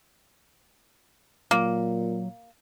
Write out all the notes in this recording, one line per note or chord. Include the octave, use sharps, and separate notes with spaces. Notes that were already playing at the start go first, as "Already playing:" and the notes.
A#2 F#3 A#3